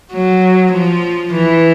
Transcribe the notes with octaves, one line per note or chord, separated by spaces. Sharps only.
F#3
F3
E3